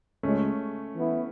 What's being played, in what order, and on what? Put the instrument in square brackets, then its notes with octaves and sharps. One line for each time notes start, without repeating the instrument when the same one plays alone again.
[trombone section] C#2 C#3 G#3 [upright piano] A3 C#4
[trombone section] E3 B3 E4